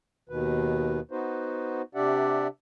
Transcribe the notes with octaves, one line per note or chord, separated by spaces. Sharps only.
D#2 B2 D#3 B4
B3 D#4 F#4 B4 C5
C3 D4 G4 D5 E5 F#5